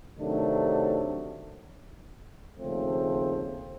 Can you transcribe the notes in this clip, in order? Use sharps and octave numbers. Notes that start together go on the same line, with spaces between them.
C3 D#3 F#3 A3 D4
D#2 C#3 F3 A3 C4